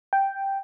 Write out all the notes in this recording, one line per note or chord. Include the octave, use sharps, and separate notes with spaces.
G5